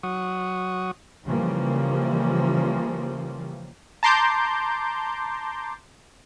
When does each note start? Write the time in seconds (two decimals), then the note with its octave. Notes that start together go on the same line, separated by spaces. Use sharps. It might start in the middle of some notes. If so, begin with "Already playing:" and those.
0.03 F#3 F#5 C#6 D#6
1.26 C#3 E3 F3 G3 A#3
4.03 A5 A#5 C6 D6 G6